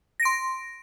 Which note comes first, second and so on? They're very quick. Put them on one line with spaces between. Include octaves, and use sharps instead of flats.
A#6 D7 C6